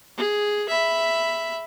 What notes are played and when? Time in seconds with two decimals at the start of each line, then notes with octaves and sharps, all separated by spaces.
0.17 G#4
0.69 E5 B5